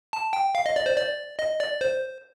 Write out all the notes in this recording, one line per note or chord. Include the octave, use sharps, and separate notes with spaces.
A5
G5
F5
D#5
D5
C5
D5
D#5
D5
C5